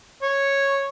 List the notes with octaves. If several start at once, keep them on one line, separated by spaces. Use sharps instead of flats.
C#5